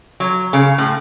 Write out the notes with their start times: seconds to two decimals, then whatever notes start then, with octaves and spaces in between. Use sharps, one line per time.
0.20 F#3
0.53 C#3
0.78 A2